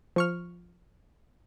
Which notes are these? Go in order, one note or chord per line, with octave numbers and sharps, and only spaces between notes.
F3 C#6 F6